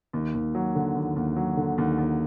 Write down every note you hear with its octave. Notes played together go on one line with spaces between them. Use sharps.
D#2
D#2
F#3
D3
D#2
D#2
F#3
D3
D#2
D#2